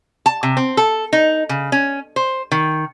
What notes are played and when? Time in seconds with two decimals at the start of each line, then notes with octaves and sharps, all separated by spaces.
0.26 A5
0.43 C3
0.57 C4
0.77 A4
1.13 D#4
1.49 C#3
1.72 C#4
2.16 C5
2.52 D#3